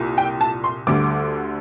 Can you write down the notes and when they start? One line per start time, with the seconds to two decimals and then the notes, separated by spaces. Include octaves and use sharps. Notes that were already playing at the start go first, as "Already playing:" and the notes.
Already playing: C2 A#2 G3
0.18 G5
0.41 A5
0.64 C6
0.87 D2 D3 G3 D6